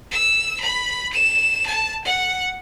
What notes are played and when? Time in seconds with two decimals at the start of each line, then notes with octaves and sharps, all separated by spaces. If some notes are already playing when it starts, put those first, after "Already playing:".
0.12 E6
0.61 B5
1.13 E7
1.67 A5
2.05 F#5